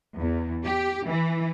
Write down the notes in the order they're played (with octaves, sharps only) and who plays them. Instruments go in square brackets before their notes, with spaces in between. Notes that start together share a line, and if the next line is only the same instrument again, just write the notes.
[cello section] E2
G4
E3